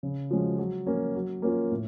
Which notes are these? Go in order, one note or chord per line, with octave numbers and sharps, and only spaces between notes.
C#3
F3 G#3 C#4 F#4
F#3
A#3 C#4
F#3
A#3 C#4 F4
A2